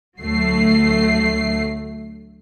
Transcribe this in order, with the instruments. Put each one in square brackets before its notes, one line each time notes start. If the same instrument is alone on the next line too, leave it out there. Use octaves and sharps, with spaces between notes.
[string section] D2 F#3 A3 C7